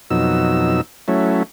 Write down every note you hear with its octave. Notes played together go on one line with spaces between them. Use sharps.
F2 B2 F#3 D#4 E6
F#3 A3 C#4 E4